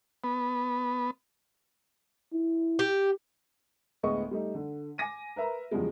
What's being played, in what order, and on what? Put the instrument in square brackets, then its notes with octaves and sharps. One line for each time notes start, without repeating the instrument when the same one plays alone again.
[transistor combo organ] B3
[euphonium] E4
[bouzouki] G4
[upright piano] D2 A2 G#3 B3 D#5 C#6
G3 A3 D#4
D3
G#5 D6 A#6 D#7
A#4 B4 E5 A#5
E2 C#3 F3 G3 G#3